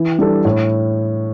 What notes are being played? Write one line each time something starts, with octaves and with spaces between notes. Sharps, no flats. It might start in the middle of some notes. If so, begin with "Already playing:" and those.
Already playing: E3
G3 D4 A4
A2